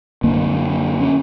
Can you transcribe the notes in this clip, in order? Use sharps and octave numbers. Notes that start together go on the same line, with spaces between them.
F#2 D3 A#3 C4
C#4